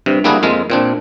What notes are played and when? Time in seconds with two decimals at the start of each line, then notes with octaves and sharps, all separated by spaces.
0.06 G2 C3
0.24 G3 A#3 D4 E4 F#4 G#4
0.43 F2 G#3 A#3 F4
0.70 A#2 C4 D4